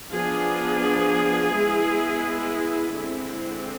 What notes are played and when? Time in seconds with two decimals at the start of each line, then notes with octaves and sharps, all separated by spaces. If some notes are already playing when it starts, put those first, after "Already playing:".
0.11 F3 B3 D4 G#4
1.53 G#3 B3 E4
2.95 D3 G#3 C4 E4